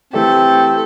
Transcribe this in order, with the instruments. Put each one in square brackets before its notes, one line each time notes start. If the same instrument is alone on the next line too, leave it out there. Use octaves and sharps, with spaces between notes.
[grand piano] E3 A3 G4 [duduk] C4 [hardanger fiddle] A4